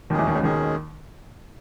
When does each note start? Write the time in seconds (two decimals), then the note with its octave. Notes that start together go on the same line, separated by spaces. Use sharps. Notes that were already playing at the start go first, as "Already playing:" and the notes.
0.10 D#2 B2 D#3 G#3 C#4 G#4
0.18 E2 E3
0.27 D#2 D#3
0.35 C#2 C#3
0.43 D#2 B2 D#3 G#3 C#4 G#4